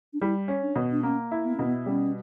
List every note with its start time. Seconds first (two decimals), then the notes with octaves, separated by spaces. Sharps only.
0.13 D4
0.21 G3 E4
0.48 C#4
0.62 D4
0.76 B2
0.92 D4
1.03 A#3 C#4
1.31 E4
1.45 B3
1.56 B2 C#4
1.66 B3
1.86 G3 C#4